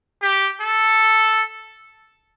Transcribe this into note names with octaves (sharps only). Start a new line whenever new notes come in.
G4
A4